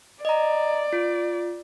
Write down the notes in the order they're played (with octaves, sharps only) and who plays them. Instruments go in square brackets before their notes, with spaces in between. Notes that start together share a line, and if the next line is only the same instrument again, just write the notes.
[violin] D5 [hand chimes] D#5 A#5
[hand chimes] F4